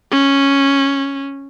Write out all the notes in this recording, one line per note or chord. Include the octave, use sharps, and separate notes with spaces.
C#4